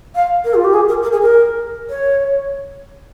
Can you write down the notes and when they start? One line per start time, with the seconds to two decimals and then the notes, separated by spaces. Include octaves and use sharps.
0.15 F5
0.44 A#4
0.54 F4
0.64 G4
0.74 G#4
0.88 A#4
1.02 A#4
1.12 G#4
1.22 A#4
1.90 C#5